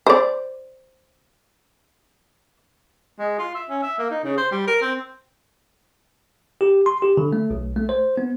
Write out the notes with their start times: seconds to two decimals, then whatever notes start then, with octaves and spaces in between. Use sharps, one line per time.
0.07 C5 D5
3.19 G#3
3.39 F4
3.55 E5
3.70 C#4
3.83 E5
3.99 A#3
4.10 D#4
4.24 C#3
4.37 C5
4.52 G3
4.67 A#4
4.81 C4
6.61 G4
6.86 C6
7.02 G4
7.17 D3
7.33 A3
7.50 B1
7.76 A3
7.89 C5
8.17 B3